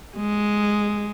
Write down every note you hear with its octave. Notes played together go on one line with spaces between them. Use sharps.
G#3